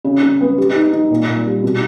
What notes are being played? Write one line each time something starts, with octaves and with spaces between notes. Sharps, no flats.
C#3
C#3
B3
G4
D#4
D#4
A#2
A#2
G3
B2